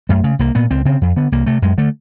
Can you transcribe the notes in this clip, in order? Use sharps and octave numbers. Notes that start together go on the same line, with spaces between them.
F#2 A3
C#3
C2 A#3
A#2 B3
C#2 C4
C#3 C4
F2
D3 B3
C2 A#3
C3 A3
F#2 G#3
D3 A3